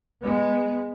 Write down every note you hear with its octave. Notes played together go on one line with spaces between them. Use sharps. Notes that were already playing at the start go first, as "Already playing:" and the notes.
G#3 B3